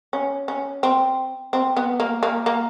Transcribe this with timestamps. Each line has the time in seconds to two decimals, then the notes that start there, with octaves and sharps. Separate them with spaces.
0.13 C#4
0.48 C#4
0.83 C4
1.53 C4
1.77 B3
2.00 A#3
2.23 A#3
2.46 A#3